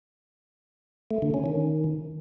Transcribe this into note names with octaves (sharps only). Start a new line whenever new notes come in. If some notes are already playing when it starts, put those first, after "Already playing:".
A3
D3
C#4
D#3